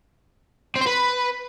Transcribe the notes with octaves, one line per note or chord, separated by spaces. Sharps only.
C4
C5
B4